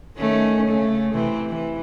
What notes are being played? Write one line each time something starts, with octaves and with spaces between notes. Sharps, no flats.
D#3 A3 C#4
C#3 A3
C3 E3 C4
E3